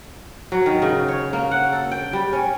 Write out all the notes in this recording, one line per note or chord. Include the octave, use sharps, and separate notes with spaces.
F#3
D#3
C#3
C#5
A#3
F#5
A4
G5
G3
C#4